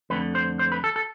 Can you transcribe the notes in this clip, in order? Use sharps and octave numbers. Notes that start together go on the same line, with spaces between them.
F2 D3 A3 B4
C5
C5
B4
A4
A4